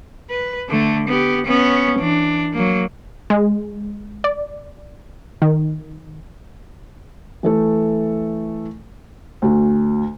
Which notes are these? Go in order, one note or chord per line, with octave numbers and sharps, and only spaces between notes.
B4
D3 A3
B3 G4
B3 C#4
E3 D4
F#3 A#3
G#3
D5
D#3
E3 A3 A4
D2 F#4